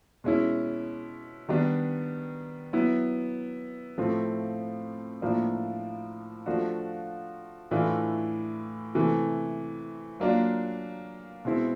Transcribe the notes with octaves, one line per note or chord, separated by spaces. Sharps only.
B2 G#3 C#4 E4
D#3 G3 B3 D4
F#3 B3 E4
A2 F3 A3 C4
A2 F3 A#3 D4
F3 A3 D4 F#4
A2 E3 A3 D4 F4
C3 E3 A3
F#3 A#3 D4 F4
B2 G#3 C4 E4